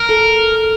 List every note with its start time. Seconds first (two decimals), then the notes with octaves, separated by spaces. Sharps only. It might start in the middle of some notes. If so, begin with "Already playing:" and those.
Already playing: A#4
0.09 A4